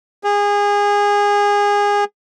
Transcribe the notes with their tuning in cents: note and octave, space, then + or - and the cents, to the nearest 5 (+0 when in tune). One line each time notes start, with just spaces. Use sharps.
G#4 -25